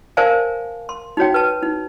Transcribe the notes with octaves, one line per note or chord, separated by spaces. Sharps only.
A#4 C5 D5 F5 G#5 A5
C6
D#4 F#4 C#5 G5
B4 A5
D#4